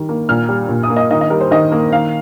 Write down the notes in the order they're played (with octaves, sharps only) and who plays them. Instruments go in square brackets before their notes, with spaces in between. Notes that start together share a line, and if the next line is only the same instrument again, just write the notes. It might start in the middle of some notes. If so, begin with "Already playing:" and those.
Already playing: [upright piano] D#3 G3
A#3
A#2 F6
G3
A#2
D#6
A#3
D#5
D#3 D#5
D#5
G3 A#4
C5
D#3 D#5
A#3
D#3 F5